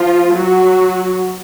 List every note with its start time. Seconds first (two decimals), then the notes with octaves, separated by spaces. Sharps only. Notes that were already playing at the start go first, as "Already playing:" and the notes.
Already playing: F3 F4
0.34 F#3 F#4